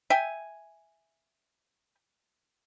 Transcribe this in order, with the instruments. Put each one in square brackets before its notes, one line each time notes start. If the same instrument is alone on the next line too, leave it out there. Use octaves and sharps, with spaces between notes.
[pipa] E5 G5 G#5